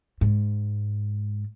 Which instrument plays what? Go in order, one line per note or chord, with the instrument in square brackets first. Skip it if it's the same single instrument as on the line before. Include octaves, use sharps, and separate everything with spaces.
[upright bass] G#2